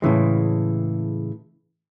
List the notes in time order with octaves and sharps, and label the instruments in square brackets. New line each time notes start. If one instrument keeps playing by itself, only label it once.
[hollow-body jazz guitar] A2 C#3 E3 G#3